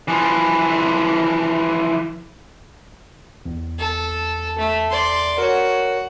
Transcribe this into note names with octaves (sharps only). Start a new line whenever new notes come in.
E3 F3
E2
A4
A3
D5 C6
F#4 A#4 C#5